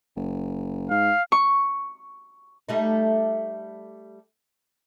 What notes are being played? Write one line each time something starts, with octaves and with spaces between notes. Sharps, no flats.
F#1
G#2 F5
C#6
G3 A3 D#4